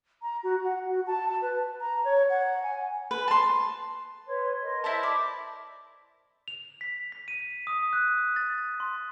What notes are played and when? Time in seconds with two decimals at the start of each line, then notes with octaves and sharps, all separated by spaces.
0.22 A#5
0.43 F#4
0.64 F#5
0.88 F#4
1.07 A5
1.28 A5
1.42 B4
1.81 A#5
2.04 C#5
2.30 F#5
2.63 G#5
3.11 B4
3.28 A5 C6
4.26 B4 C#5 C6
4.63 A#4 D#5 C6
4.84 E4 C5 A5
5.03 D5
6.48 F7
6.81 B6
7.12 B6
7.28 D#7
7.67 D#6
7.93 F#6
8.36 A6
8.80 C6